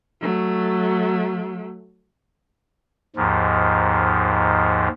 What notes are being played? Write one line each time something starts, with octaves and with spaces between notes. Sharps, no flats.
F#3 A3
D#2 G#2 F3